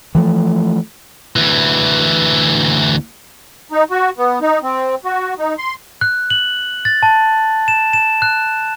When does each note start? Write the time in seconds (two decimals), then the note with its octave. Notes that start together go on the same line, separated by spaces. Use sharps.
0.15 E3 F3 A3
1.36 D2 E3
3.72 D#4
3.91 F#4
4.18 B3
4.41 D#4
4.63 C4
5.05 F#4
5.38 D#4
5.58 C6
6.01 F#6
6.30 F#7
6.85 A6
7.03 A5
7.68 E7
7.93 E7
8.22 F#6